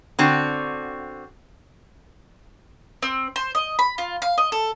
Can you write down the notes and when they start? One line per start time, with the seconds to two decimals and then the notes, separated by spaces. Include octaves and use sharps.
0.19 D3 C4 F#4
3.02 C4
3.36 C5
3.55 D#5
3.79 B5
3.98 F4
4.22 F5
4.38 D#5
4.52 A4